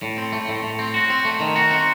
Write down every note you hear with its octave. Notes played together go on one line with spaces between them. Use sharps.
A2
C4
A3
A2
A2
C4
F#4
C4
A3
D#3
F#4
C4